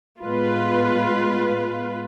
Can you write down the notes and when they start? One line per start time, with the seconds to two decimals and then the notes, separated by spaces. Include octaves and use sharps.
0.21 A2 G#3 B3 F4 B4